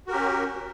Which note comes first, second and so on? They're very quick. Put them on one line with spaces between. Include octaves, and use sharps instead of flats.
F#4 A#4 G4 C#4